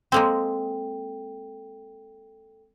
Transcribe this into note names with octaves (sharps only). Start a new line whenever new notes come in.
G#3 A#3 C4 A4 G5